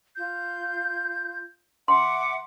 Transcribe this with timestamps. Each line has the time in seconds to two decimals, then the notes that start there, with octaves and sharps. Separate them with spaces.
0.16 F4 G6
1.88 E5 F#5 C6 D6